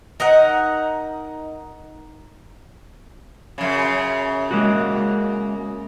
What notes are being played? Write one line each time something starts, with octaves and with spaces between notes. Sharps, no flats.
D#4 A#4 D#5 F#5
F#2 C#3
G#3 A#3 F#4